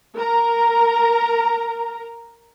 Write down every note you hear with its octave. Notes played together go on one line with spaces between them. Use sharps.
A#4 A#5